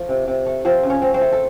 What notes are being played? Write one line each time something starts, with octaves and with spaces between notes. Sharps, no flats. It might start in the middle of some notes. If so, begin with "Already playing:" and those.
Already playing: F3 A3
C3
C3
A3
F3 C4 C5
C#3
C#4 C#5
C4
C4 C5
A3
A4